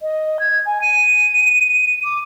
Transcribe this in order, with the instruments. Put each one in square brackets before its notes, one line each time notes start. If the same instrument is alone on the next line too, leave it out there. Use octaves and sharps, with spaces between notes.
[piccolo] D#5
G#6
G#5
D#7
D6